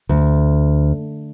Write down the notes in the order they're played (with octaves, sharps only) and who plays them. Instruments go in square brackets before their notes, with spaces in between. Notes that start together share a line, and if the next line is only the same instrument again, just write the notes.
[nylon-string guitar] D2